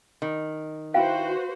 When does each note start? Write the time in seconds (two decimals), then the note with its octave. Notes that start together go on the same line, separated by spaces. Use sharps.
0.22 D#3
0.94 E4 F#4 B4 C5 F5 G5